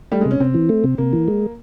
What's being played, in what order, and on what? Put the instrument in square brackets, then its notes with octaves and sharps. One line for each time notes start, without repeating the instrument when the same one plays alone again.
[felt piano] G3 [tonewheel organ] A3
[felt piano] G#3
[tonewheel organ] C3 [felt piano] C#4
[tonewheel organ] C3 [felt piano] C4
[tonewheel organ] E3
A3
C3
[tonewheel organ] C3 [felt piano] A#3
[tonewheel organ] E3
G#3